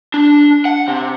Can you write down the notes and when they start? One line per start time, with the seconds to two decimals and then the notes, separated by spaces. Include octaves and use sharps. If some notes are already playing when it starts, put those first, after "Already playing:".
0.14 D4
0.65 F#5
0.88 C3